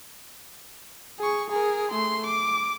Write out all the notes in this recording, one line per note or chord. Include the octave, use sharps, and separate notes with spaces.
G#4 C#6
G#4 A#4
A3 C6
D6